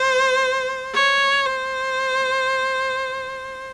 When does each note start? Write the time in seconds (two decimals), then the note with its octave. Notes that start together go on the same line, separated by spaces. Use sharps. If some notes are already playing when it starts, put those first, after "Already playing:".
Already playing: C5
0.95 C#5
1.46 C5